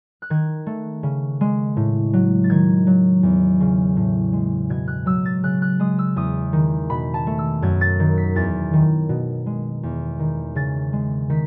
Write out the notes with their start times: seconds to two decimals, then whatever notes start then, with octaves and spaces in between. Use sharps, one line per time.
0.22 F#6
0.30 D#3 G#6
0.66 A3
1.03 C#3
1.41 G#3
1.77 A2
2.13 F#3
2.44 A6
2.50 D#3 G#6
2.87 F#3
3.23 E2
3.60 C#3
3.97 A2
4.33 G#3
4.70 B2 G#6
4.88 F#6
5.06 F#3 E6
5.25 A6
5.43 C#3 F#6
5.62 F#6
5.79 G#3 D#6
5.99 E6
6.16 E2 D#6
6.53 D#3
6.90 B2 B5
7.14 A5
7.27 A3
7.38 E6
7.62 F#2 G#6
7.81 A6
8.00 D#3
8.18 B6
8.36 E2 A6
8.73 D#3
9.09 B2
9.46 G#3
9.83 E2
10.19 D#3
10.55 C#3 A6
10.93 G#3
11.30 D#3 B6